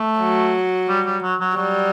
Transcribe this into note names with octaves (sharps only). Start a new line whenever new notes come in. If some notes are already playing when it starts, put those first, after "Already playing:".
Already playing: A3
F#3
G3
G3
F#3
F#3
F#3 G3